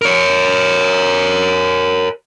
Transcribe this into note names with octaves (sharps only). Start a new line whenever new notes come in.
A#4 C#5